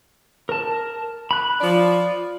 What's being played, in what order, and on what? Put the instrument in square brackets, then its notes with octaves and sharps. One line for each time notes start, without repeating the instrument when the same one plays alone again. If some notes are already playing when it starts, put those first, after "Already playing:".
[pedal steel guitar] A#4 A5
B5 F#6
[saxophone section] F3 D5